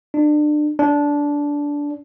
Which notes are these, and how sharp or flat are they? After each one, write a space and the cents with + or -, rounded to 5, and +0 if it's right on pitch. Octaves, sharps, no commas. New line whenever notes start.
D4 +30
D4 -15